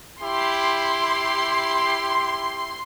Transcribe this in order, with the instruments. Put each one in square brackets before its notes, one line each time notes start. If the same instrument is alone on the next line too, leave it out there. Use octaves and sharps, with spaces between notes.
[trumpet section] E4 G4 [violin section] C6